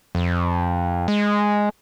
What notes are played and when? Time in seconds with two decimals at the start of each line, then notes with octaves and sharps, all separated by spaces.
0.15 F2
1.08 G#3